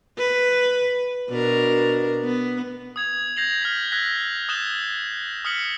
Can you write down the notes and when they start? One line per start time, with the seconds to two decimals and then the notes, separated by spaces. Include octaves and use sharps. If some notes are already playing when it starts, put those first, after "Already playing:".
0.18 B4
1.29 B2 D4 A#4
2.24 B3
2.96 D#6 G#6 F7
3.37 G6 G#6 A#6 C7 F7 F#7
3.62 F6 G6 B6
3.92 E6 F#6 G#6 A#6 B6
4.49 D#6 F#6 A6 E7 G7
5.45 D#6 F6 B6 C#7 F#7